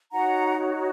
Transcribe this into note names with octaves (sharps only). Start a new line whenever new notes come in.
D#4 F#4 C#5 F#5 A#5